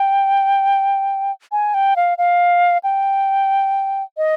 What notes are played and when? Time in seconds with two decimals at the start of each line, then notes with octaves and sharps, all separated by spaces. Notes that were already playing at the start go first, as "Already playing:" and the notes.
Already playing: G5
1.52 G#5
1.74 G5
1.96 F5
2.18 F5
2.84 G5
4.17 D#5